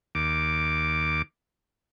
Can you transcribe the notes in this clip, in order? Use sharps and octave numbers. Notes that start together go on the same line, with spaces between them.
D#2 D6